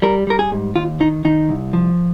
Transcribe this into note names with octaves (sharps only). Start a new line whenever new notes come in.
G3 A#4
G3 A#4
G#4
G#2
D#2 F4
D#3 D#4
D#3 D#4
C2
F3